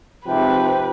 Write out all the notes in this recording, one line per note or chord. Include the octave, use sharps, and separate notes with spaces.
G#2 C3 F3 B4 G5